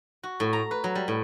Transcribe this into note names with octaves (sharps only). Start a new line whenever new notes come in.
F#4
A2
A#5
B4
F#3
G3
A2